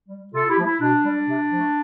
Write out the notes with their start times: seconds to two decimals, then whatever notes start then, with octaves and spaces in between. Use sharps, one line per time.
0.09 G3
0.32 C3 F4 A4
0.48 E4 G4
0.57 F3 A3
0.64 E4
0.80 B2 D4
1.04 G3
1.27 C3
1.51 F3 A3